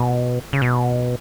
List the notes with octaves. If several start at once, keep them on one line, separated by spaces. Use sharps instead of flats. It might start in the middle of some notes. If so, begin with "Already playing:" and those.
Already playing: B2
C#3
B2